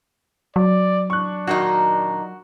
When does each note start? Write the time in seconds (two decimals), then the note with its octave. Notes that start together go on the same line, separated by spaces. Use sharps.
0.56 F#3 D5
1.10 D4 C#6 F#6
1.47 A#2 D#3 D#4 F#4